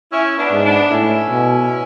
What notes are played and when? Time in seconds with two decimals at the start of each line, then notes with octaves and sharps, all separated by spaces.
0.11 C#4 E4
0.38 B3 D4
0.51 G#2
0.64 B3 D4
0.91 A2 C#4 E4
1.30 B2